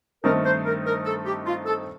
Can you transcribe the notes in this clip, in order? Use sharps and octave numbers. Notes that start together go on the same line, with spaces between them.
G2 D#3 A3 C4 D#4 A#4
C5
A#4
A#4
A4
G4
F4
A4